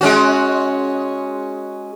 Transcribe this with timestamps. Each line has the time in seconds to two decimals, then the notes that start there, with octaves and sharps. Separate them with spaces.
0.01 G#3 C#4 F#4